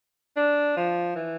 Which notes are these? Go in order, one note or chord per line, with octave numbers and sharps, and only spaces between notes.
D4
F3
E3